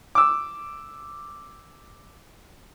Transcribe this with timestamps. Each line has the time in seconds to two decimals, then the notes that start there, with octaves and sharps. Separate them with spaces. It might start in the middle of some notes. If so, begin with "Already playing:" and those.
0.15 D6 E6